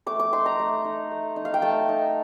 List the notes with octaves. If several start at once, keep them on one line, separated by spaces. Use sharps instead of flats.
A3 D6
D6
D#4 C6
A#5
A3
D#4
A3
D#4
F5
G5
A3 A5
D#4